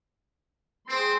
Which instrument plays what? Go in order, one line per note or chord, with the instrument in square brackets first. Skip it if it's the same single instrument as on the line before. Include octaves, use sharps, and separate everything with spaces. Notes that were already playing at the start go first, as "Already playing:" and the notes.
[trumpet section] C4 [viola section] G#4 C5 C6